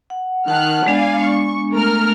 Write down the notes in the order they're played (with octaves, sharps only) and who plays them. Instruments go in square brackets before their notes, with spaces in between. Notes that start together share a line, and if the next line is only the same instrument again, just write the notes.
[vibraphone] F#5
[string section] D#3 F6 F#6 [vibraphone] F#5 A5
[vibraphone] G#3 B3 D4 [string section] D5 F5 G#5
[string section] C#6
A3 A#4 F6